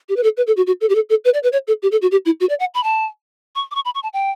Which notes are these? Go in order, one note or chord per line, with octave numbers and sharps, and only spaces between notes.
G4
B4
A4
B4
A4
F#4
F#4
A4
G4
A4
A4
B4
D5
B4
C#5
A4
G4
A4
F#4
G4
E4
F#4
D5
F#5
B5
A5
C#6
D6
C#6
B5
C#6
A5
G5